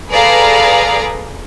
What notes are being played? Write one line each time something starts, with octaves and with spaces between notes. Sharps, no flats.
G#4 A4 B4 D5 F5 A#5